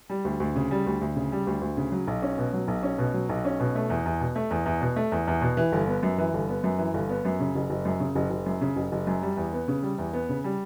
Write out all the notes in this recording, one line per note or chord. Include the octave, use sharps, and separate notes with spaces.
G3
D2
D2
C#3
G3
D2
D2
C#3
G3
D2
D2
C#3
F#3
B1
C#4
B2
F#3
B1
C#4
B2
F#3
B1
C#4
B2
A3
E2
E2
B2
A3
E2
E2
B2
A3
E2
E2
B2
E3
G1
B3
F#2
E3
G1
B3
F#2
E3
G1
B3
F#2
C#3
F#1
F#1
F#2
C#3
F#1
F#1
F#2
C#3
F#1
F#1
F#2
G3
E2
B3
C#3
G3
E2
B3
C#3
G3